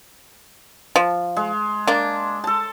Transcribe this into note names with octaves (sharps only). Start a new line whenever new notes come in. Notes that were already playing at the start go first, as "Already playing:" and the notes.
F3
G#3
A#3 D4
A4 A5